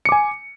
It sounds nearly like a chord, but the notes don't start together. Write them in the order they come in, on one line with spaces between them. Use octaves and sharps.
C#7 D6 G#5